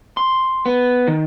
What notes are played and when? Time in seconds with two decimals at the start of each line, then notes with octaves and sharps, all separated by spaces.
0.17 C6
0.66 B3
1.08 D#3